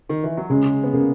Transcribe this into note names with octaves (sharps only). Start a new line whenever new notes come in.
D#3
E3
F#3
C#3 G#3
B3
C#3 A#3